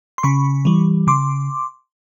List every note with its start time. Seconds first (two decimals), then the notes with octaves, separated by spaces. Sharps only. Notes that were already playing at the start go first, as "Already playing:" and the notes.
0.18 C6
0.23 C#3 B5 C#6
0.65 E3 G3
1.07 C#3 C6 D6